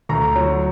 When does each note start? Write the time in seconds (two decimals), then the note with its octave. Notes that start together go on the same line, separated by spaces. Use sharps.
0.09 D2 A#5
0.36 F#3